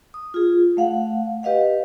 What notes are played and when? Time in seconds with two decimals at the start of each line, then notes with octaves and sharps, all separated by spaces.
0.14 D#6
0.34 F4 G#4
0.77 A3 F5 F#5
1.43 G4 B4 D#5 F5 F#5